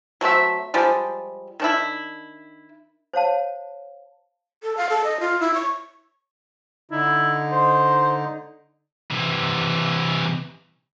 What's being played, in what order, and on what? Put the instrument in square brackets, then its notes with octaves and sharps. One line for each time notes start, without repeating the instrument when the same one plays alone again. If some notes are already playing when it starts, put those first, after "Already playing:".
[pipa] F#3 A3 C4 E5
F3 G3 G#3
D#3 D4 E4
[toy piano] C5 C#5 F5 A5
[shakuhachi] A4
F5
A4
D#5
F4
E4
C#6
[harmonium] D3 D#4 [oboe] E4
[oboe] C5
[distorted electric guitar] C3 E3